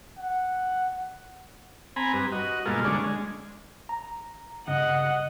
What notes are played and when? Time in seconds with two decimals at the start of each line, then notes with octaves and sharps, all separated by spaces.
0.18 F#5
1.96 C4 G#5 A#5 B5
2.13 G2 B4
2.32 F#4 D#5
2.66 G2 B2 G#3 A#3 F4 A4
2.85 D3 G#3 C#4 D4
3.04 G#3
3.89 A#5
4.67 G2 C#3 D#5 F#5